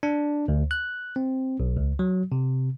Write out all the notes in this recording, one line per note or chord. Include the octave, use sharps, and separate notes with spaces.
D4
D2
F#6
C4
B1
C#2
F#3
C3